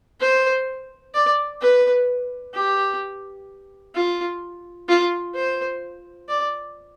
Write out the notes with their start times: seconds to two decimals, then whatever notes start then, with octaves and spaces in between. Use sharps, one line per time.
0.20 C5
1.14 D5
1.61 B4
2.53 G4
3.95 F4
4.89 F4
5.35 C5
6.28 D5